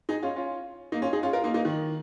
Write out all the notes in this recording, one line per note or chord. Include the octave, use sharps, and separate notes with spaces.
D#4 G#4
C#4 F4
C#4 F4
A#3 D#4
C#4 F4
D#4 G#4
C#4 F4
F4 A#4
A#3 D#4
A#3 D#4
D#3